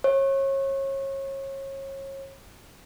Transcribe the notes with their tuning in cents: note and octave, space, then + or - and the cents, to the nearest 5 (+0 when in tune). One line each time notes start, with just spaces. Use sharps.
C#5 -30